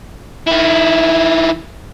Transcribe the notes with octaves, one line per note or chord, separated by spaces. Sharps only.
D#3 E4